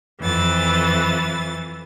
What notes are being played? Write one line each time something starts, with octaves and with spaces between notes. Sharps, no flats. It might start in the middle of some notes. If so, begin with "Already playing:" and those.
F2 E3 A6